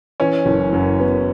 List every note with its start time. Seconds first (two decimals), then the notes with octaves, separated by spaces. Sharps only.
0.20 E3 C#4
0.46 F#1
0.72 F#2
1.00 B3